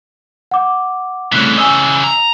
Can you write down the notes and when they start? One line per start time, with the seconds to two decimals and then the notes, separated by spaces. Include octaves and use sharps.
0.51 F#5 D6
1.32 C2 A2 C#3 E3 F#6 B6
1.58 D#5 G#5 E6
2.04 A#5